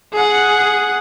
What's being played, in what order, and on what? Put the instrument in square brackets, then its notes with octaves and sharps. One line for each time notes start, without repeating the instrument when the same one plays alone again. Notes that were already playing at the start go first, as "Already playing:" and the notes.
[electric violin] G#4 F#5